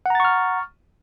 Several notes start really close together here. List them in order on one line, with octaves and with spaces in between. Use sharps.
F#5 A#5 A6 C#6 F6